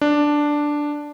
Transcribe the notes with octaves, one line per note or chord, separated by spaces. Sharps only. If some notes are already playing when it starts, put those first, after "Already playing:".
D4